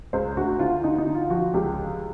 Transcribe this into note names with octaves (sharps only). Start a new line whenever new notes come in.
C#2 C5
D2 F#4
D3 F4
D3 D#4
D#4
D3
F4
F3 F#4
C#2 G4